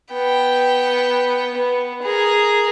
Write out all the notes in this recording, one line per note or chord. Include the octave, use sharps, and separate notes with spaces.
B3 G5
B3
G#4 A#4